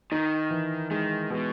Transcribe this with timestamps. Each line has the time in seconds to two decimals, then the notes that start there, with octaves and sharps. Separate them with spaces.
0.12 D#3 D#4
0.50 E3
0.91 D#3 G#3
1.30 B2 G#3